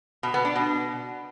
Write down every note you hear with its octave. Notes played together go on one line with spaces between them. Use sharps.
B2
B3
D4
B2